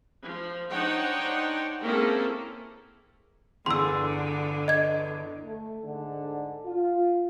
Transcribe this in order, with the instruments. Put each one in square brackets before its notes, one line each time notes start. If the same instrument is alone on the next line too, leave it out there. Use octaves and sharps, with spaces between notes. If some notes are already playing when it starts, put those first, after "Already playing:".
[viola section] F3
D4 D#4 C5 C#5 F#5 G5
A#3 C4 C#4 E4 G#4 A4
[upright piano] G1 E2 G#4 [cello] D3 [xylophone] C6 E6
[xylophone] D#5 G#6
[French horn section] A3
G#2 D3
F4